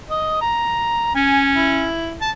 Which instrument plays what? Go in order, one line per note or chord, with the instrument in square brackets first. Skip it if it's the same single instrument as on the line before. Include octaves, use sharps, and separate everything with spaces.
[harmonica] D#5
A#5
[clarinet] C#4 [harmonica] G#5
[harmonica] E4
[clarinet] A5